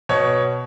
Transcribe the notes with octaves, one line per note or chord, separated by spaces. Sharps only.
B2 C#5